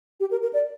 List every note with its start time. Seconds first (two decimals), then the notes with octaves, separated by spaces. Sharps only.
0.20 G4
0.31 A#4
0.43 A#4
0.53 D5